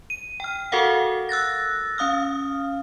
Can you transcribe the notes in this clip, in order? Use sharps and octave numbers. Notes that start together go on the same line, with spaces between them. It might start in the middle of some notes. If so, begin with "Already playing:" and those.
D#7
G5 F6
F#4 A4 A#4 F5 F#5
E6 F#6 A6 A#6
C#4 F5 D#6 F6